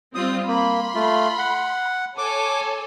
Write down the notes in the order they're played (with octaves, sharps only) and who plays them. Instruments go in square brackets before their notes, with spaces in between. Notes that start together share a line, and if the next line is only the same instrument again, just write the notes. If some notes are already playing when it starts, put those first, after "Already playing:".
[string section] G3 C4 F4 [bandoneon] D#6
[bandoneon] A#3 [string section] B5 C6
[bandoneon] A3 F4
F#5
[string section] A4 C#5 G#5 [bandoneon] D6